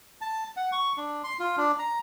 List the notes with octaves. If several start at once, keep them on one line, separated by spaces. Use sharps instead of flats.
A5
F#5
C#6
D4
C6
F4
D4
A#5